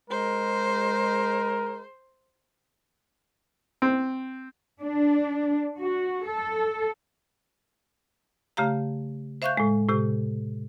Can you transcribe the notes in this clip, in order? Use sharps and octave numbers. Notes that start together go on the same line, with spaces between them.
G#3 A#4 C5
C4
D4
F#4
A4
C#3 A3 G4 F5 A#5
C5 E5 F5 C#6 F#6 G6
A2 G#3
A2 C3 G4